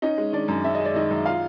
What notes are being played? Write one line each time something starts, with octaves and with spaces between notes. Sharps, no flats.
C#4 D#4 D#5
G#3
D#3 D4 D5
F#2
C#4 E5
G#3 D#5
D5
D#3 D#4 D#5
F#2
F4 F5